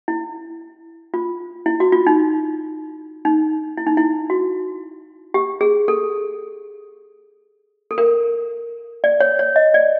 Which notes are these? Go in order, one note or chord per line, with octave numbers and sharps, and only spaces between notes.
E4
F4
E4
F#4
F4
D#4
D#4
E4
D#4
E4
F#4
G4
G#4
A4
A4
A#4
D5
C#5
C#5
D#5
D5